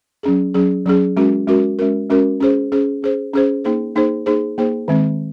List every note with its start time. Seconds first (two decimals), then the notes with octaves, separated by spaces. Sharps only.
0.23 F#3 C#4 G#4
0.54 F#3 C#4 G#4
0.86 F#3 C#4 G#4
1.17 G#3 C#4 F#4 A#4
1.47 G#3 C#4 F#4 A#4
1.79 G#3 C#4 F#4 A#4
2.10 G#3 C#4 F#4 A#4
2.40 C#4 G#4 C5
2.72 C#4 G#4 C5
3.02 C#4 G#4 C5
3.34 C#4 G#4 C5
3.64 A#3 D#4 G#4 C5
3.95 A#3 D#4 G#4 C5
4.26 A#3 D#4 G#4 C5
4.58 A#3 D#4 G#4 C5
4.88 D#3 G#3 C4